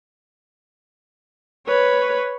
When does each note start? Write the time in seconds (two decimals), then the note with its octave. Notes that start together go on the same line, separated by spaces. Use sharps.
1.67 B4 C#5